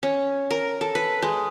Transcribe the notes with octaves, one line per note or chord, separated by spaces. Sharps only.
C#4
A#4
A4
B4
G#3